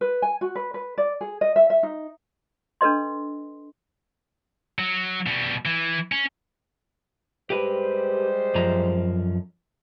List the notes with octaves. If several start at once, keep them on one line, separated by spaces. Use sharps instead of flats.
B4
G#5
F#4
B4
B4
D5
G#4
D#5
E5
E5
D#4
D4 A4 B4 D#5 C6
F#3
B2 G3
E3
C#4
G3 G#3 G4 B4 C5
F#2 F3 A#5